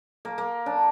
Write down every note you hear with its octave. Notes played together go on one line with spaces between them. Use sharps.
A#3
A#3
D4